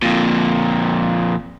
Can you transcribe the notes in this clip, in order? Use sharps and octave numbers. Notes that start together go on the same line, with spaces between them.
F2 A#2